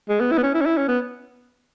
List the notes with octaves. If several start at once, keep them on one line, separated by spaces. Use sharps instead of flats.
G#3
B3
E4
B3
C#4
E4
C#4
E4
C#4
B3